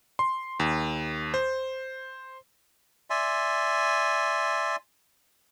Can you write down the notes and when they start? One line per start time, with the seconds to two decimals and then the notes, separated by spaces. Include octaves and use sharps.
0.19 C6
0.60 D#2
1.34 C5
3.10 D5 E5 G#5 C6